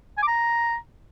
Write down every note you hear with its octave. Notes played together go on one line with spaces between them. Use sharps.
G#5
D6
A#5